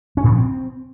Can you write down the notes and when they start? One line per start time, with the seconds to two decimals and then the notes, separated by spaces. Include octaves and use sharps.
0.17 C#4
0.24 A#2
0.31 F3
0.38 C4